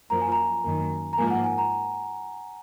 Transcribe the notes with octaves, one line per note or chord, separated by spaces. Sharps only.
F#2 F3 A#3 A#5
G#5
A#5
F#2 D#3 A#3
A#5
G#2 F3 A#3 G#5
F#5
G#5
A#5